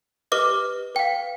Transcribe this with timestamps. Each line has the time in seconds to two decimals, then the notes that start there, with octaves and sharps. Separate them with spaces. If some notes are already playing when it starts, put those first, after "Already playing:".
0.32 G4 B4 D#5 D6 F6
0.95 B4 F5 G5